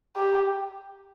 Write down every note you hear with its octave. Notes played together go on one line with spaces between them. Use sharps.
G4